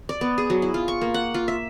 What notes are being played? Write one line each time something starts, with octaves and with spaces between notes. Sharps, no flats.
D5
B3
G#4
F#3
E4
F4
C#6
A#3
F#5
F4
E5